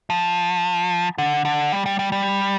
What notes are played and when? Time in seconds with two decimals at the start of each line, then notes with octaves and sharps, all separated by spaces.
0.10 F3
1.18 D3
1.45 D3
1.72 G3
1.86 G3
1.99 G3
2.12 G3